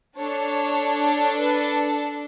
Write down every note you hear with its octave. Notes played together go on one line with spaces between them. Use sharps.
D4 A4 C#5
B4